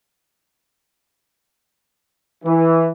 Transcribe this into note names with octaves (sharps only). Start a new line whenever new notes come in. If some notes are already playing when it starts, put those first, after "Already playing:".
E3